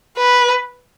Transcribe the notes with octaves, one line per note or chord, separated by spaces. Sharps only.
B4